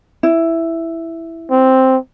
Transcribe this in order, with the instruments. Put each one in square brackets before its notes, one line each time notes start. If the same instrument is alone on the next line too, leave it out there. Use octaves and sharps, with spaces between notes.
[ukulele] E4
[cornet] C4